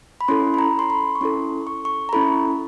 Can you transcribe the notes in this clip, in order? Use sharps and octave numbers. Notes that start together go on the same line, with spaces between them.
B5
C#4 E4 A4 C6
B5
A#5
C6
B5
C#6
C#4 E4 A4 C6
C#6
C#6
A#5
C#4 E4 A4 B5